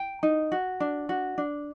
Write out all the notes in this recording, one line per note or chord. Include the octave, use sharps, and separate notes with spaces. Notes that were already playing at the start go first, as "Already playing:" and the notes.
Already playing: G5
D#4
F#4
D4
F#4
D4